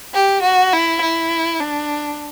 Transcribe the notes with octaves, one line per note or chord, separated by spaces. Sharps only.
G4
F#4
E4
E4
D4